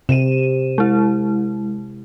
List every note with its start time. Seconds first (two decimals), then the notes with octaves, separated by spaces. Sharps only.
0.09 C3 D#7 E7
0.78 G#3 E4